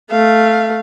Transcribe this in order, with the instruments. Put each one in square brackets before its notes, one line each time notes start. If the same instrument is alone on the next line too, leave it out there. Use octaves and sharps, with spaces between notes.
[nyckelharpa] A3 [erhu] F5